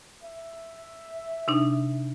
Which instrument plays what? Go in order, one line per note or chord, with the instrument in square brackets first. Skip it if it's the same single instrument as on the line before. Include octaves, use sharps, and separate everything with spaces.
[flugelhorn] E5
[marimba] C3 D4 D#4